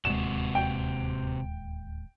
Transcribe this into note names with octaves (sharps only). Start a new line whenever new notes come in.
D1 D#2 C3 G#3 F#4 E7
G5